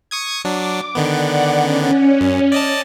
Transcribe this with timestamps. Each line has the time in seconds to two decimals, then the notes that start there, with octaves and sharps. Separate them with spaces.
0.11 C#6 D#6 G#6
0.45 F#3 D4 D6
0.95 D3 D#3 B3 D5 F#5
1.59 C#4
2.21 F#2
2.52 D5 D#5 A5